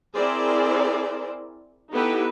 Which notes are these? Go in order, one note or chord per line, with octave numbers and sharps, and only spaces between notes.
C4 E4 G#4 A#4 C5 D5
B3 D#4 E4 G4 A4 B4